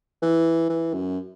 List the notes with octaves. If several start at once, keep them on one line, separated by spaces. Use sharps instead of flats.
E3
E3
F#2